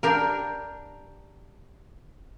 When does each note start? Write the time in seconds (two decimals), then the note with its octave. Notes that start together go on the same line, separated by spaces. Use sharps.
0.03 D4 G4 A#4